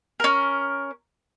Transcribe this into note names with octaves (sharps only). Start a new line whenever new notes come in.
C#4 A#4